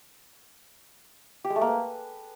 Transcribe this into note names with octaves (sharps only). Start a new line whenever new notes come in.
G4
G#3
A3
A#3
B4